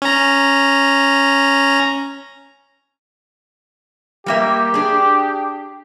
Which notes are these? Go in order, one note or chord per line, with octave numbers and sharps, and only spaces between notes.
C#4 A#5
G3 A#3 G4 E5
D4 G#4